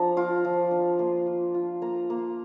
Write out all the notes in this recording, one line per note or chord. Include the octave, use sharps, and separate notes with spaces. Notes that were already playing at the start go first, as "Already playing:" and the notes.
Already playing: F3 D4 A#5
F4 D6
F3
D4
A#3 C6
F4
F4
A#3 A#5
A#3